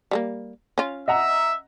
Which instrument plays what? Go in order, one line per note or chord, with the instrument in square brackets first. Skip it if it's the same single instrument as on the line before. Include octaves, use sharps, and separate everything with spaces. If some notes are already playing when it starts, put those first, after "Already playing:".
[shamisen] G3 G#3 A#3
C#4 F4
[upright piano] D#5 F#5 A#5 [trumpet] E5